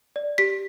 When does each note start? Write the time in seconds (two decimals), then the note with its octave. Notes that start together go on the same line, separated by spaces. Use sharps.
0.16 D5
0.38 G4 B6